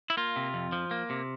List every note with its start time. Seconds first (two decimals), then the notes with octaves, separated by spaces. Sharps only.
0.10 E4
0.17 A#3 F4
0.36 C3
0.54 F2
0.72 F3
0.91 A#3
1.10 C3